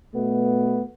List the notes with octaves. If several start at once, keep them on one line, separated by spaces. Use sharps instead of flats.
B2 A3 B3